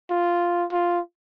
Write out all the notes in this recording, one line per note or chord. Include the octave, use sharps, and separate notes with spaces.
F4
F4